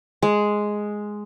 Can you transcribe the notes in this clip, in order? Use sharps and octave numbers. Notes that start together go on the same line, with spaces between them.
G#3